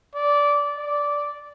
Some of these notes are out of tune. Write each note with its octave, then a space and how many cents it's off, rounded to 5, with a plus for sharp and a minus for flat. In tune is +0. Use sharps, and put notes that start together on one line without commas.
D5 -15
D5 -10